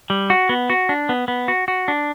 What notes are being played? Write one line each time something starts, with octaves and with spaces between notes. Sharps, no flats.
G3
F#4
B3
F#4
D4
B3
B3
F#4
F#4
D4